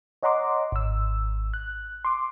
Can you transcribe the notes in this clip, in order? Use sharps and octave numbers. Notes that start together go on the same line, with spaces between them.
C#5 D#5 F#5 A#5 C6 D6
G#1 E6
F#6
C6 D6